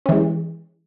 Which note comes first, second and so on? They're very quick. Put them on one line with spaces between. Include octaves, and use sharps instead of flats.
C#4 E3 G#3